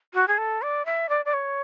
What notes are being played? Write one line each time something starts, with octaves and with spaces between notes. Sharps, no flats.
F#4
G#4
A4
D5
E5
D5
D5
C#5